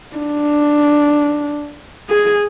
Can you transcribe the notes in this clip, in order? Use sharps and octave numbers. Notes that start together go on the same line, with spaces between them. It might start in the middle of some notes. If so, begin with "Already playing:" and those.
D4
G#4